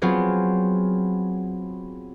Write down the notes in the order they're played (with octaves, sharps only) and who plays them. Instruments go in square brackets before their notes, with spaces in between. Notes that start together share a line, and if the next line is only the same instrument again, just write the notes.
[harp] F#3 B3 C4 F4 G#4